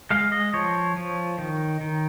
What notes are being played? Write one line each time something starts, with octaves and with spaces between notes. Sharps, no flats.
G#3 F5
D#5
F3 C#5
F3
D#3
D#3